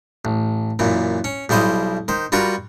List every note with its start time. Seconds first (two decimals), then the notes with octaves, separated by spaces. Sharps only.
0.25 A1
0.79 F#2 A#2 E3
1.24 C#4
1.49 B1 G3 E4 C5 D#5 F5
2.08 D#3 C5
2.32 G3 F4 F#4 A#4 B4